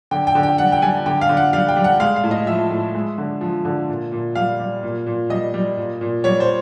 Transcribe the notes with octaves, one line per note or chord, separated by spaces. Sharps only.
D3 G5
G5
D3
G5
G3 F#5
G5
G3 G#5
D3 G5
F5
D3
F#5
G3 F5
G5
G3
F#5
G#3 F5
F5
A2
D#5
F3 E5
A2
G#3
D3
F3
D3
A#2
A#2
G3 F5
G3
A#2
A#2
G3 D#5
G3
A#2
A#2
G3 C#5
C5